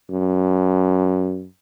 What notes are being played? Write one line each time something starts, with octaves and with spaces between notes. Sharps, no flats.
F#2